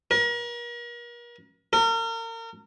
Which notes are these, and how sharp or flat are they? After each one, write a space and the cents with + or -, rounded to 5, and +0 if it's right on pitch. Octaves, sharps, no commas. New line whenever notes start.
A#4 +40
A#4 -35